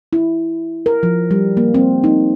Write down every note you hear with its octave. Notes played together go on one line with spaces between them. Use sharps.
E4
A#4
F3
G3
A#3
C4
D#4